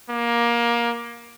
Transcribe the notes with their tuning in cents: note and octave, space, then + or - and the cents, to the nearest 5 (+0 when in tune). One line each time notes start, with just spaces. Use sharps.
A#3 +20